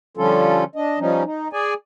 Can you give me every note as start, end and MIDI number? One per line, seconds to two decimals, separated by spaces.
0.17 0.64 50
0.17 0.64 53
0.17 0.64 55
0.17 0.64 61
0.17 0.64 65
0.17 0.64 69
0.76 0.99 62
0.76 0.99 75
0.99 1.24 53
0.99 1.24 55
0.99 1.24 61
0.99 1.24 63
1.25 1.48 63
1.53 1.74 68
1.53 1.74 74
1.53 1.74 80